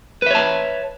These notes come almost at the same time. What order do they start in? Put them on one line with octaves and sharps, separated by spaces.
B4 E5 C#5 A5